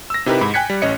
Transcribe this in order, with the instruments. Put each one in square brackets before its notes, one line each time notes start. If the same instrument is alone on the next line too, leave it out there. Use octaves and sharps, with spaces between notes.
[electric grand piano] E6 A#6
C3 D#4 E4 G4 A#4 B4
G#2 B5
G5 G#5 F#6 G#6 B6 C#7
G3
A1 C#4 C#5 D#5 C#7